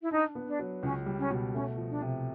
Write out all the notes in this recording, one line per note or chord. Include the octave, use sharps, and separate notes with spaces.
E4
D4 D#4
B3
D4
F#3
C#2 C#4
G3
C#4
B2
A3 C#4
F3
D4
C3